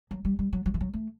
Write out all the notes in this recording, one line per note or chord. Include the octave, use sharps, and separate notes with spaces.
F#3
G3
G3
F#3
F#3
E3
F#3
A3